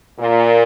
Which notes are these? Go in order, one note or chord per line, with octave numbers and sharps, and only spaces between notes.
A#2